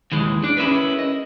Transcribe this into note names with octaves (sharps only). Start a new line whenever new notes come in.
D#2 E3 G#3
D4 D5
C#4 E4 G#4 A#4 B4
D#5